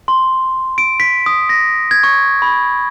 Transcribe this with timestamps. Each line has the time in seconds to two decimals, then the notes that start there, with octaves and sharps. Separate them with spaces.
0.08 C6
0.78 D7
1.00 B6
1.26 D#6
1.49 A#6
1.91 G#6
2.03 C#6
2.42 B5